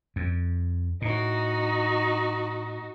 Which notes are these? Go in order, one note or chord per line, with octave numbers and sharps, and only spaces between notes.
F2
A2 D#4 F#4